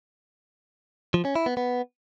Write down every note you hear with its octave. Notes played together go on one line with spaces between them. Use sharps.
F3
C#4
E4
B3
B3